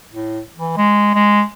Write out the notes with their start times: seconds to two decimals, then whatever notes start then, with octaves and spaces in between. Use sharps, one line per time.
0.14 A2
0.56 E3
0.77 G#3
1.15 G#3